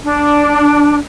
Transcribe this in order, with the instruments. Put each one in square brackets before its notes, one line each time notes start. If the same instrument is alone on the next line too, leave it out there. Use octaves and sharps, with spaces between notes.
[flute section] D4